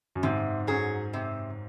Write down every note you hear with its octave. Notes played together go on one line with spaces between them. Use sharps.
F#2
G#2 C3
F#3 C#4 G#4
C3